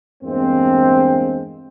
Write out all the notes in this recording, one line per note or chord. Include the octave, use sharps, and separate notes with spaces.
E2 G2 G#3 A#3 C4